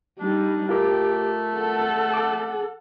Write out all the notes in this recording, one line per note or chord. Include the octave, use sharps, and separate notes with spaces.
G3 D4 D#4
A3 F4 G4 A#4 D6
A4 F#5
D6